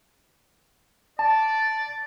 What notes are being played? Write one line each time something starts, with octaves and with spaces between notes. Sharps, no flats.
D5 A5